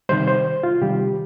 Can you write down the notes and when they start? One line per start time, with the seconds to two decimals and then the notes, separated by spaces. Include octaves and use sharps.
0.09 C3 D#3 G3 C5
0.27 C5
0.63 F4
0.81 C3 D#3 G3 G4